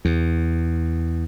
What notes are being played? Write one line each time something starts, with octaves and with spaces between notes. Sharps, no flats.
E2